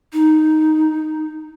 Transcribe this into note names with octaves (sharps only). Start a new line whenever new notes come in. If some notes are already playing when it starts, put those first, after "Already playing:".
D#4